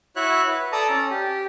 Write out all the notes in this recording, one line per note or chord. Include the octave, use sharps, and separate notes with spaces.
E4 F#4 C#5 E5 F#6
B4
A4 D5 A5 A#5 D#6
C#4
G4